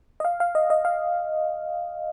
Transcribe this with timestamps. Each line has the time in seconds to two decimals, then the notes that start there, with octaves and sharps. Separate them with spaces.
0.20 D#5
0.25 F5
0.40 F5
0.55 D#5
0.70 D#5
0.85 F5